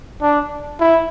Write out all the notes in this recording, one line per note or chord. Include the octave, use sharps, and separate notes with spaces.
D4
E4